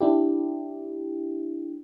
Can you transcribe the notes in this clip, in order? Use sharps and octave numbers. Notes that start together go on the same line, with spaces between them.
D4 E4 G4